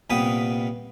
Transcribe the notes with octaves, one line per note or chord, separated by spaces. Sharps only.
C2 A#2 B3 B4 G5 D#6